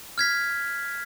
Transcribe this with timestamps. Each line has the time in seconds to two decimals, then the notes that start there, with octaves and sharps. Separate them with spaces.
0.18 F6 G#6 B6